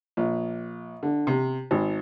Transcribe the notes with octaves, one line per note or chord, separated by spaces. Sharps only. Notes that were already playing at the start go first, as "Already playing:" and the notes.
A#1
D3
C3
G#1